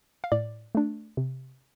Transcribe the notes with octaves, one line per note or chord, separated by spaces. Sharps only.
F5
A2 D5
A3 D4
C3